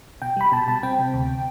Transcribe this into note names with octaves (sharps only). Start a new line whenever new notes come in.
B2 G5
G3 B5
B2 A5
B2 A5
C4 G5
C3
D2